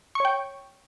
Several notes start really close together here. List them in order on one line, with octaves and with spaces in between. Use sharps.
C#6 C#5 G5